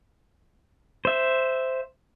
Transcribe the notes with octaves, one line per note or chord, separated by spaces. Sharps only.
C5 E5